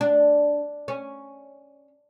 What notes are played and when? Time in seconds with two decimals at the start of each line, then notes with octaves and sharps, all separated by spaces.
0.01 D4
0.88 C#4